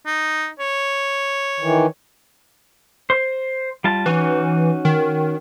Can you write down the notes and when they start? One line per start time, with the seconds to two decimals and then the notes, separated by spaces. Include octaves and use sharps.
0.06 D#4
0.60 C#5
1.60 D#3 E3
3.10 C5
3.84 G3 F4 A5
4.06 E3 C#4 D#4 F#4
4.85 D#3